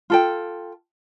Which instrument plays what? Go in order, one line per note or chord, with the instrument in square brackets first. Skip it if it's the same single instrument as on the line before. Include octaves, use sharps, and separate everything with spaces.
[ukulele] F4 A4 G5